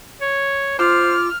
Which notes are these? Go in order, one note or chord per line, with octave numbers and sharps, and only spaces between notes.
C#5
F4 C5 D6 F6